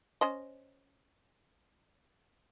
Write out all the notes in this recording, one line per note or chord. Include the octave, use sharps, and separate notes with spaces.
C#4 C5 D#5